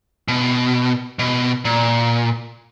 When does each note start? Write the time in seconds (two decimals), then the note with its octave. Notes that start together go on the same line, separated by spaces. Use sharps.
0.28 B2
1.19 B2
1.65 A#2